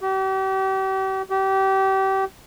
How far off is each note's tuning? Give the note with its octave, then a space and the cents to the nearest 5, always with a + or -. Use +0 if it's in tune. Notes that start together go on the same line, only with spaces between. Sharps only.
G4 -40
G4 -30